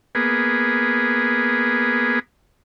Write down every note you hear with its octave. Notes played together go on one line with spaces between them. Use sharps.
A#3 B3 G#4